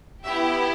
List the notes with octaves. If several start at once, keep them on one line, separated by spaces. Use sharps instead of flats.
B3 E4 G4 E5